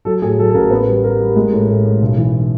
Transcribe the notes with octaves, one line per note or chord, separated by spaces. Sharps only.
F#3 A4
A2 G#4
F#3 A4
A4
A1 A#4
B3 B4
G3
G3 A#4
G3
G#3
A2
A2
A2
B1
E3